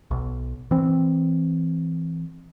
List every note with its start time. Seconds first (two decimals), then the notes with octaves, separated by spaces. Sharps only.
0.11 B1
0.71 E3 C4